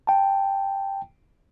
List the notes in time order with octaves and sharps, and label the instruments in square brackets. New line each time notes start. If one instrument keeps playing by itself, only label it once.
[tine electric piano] G5 A5